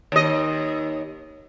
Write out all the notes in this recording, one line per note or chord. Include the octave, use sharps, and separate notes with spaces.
D#2 D#5